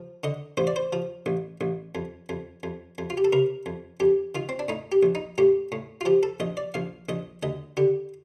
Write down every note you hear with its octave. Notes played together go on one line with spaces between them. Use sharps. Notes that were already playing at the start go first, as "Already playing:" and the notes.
Already playing: F3
D3 D#5
A1 C5
D5
C5
F3
A1
A1
F2
F2
F2
F2
F4
G4
A4
C3 A#4
F2
F2 G4
D#3 F4
C4
D4
A2 D#4
G4
A#1
D#4
A2 G4
A2
F4
F3 G4
A4
A#1 D#5
D5
A#1 F5
A#1 D#5
D2 D#5
D3 G4